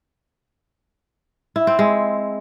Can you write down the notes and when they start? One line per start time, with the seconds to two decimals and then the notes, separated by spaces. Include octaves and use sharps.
1.56 E4
1.67 C4
1.79 G#3